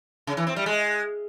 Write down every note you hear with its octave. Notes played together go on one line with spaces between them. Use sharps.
C#3
E3
C4
G3
G#3